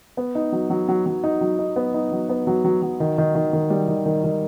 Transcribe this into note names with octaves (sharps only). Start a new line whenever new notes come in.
B3
D#4
F#3
F#3
F#3
F#3
D#4
F#3
D#4
B3
D#4
F#3
B3
F#3
F#3
F#3
D#3
D#3
D#3
D#3
G3
D#3
D#3
D#3